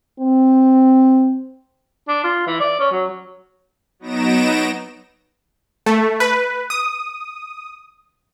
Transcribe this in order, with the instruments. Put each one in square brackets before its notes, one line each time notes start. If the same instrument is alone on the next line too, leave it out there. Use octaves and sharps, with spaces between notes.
[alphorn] C4
[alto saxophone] D4
F4
E3
D5
C#4
F#3
[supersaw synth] F#3 B3 D#4 A#6 D7 E7
A3
B4
D#6